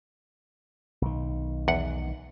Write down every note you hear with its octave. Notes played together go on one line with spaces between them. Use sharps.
B1 D#3
E2 F#5